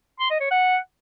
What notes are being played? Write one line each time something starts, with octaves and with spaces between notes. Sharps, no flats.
C6
D#5
C#5
F#5